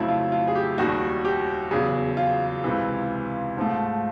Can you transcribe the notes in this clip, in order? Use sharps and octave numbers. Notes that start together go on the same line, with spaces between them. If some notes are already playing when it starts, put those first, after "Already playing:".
Already playing: F2 C#3 F#3 A3 E4
F4
F4
G#4
G4
D#2 D#3 G3 F#4
G4
E2 C#3 F#3 G#4
F4
C#2 C3 E3
G#2 F3 A3